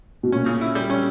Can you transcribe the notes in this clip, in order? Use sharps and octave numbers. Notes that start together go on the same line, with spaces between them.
B2
A#2 C#4
C#3
E4
G3
C#4